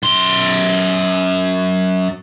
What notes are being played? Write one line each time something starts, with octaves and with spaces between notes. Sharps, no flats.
F#2 C6